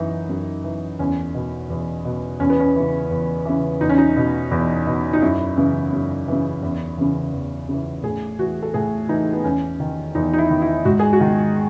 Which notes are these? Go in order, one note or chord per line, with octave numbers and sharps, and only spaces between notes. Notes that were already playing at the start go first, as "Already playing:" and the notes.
Already playing: F#2 E3 D#4
F#2
E3
E2 C#4
B2
E2
B2
E2 C#4
B3
C#4
C#3 E3
E2
C#3 E3
E2 D#4
C#4
D#4
B2
E2
B2
D#4
F#2 E4
C#3 E3
F#2
C#3 E3
E2
C#3 E3
E2
C#3 E3
A2 G#4
E3 F#4
A4
A2 G#4
E3 D#4
B3
E2 C#4
D#3
E2 D#4
D#4
E4
D#3
E4
G#2 F#4
G#4
F#4
D#3